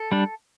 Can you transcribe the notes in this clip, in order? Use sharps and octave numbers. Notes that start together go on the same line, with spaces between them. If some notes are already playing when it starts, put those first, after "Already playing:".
Already playing: A4
G3 D4